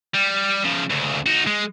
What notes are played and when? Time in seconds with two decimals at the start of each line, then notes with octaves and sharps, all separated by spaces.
0.15 G3
0.65 C#3 F3
0.90 D2 C#3
1.26 D#4 F#4
1.47 G#3